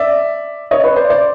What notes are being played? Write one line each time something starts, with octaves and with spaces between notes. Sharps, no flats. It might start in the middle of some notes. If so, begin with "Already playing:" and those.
Already playing: D5 E5
C#5 D#5
B4 C#5
C5 D5
C5 D5